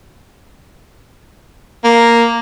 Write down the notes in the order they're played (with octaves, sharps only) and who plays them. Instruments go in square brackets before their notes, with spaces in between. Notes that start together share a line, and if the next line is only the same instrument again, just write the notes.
[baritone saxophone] A#3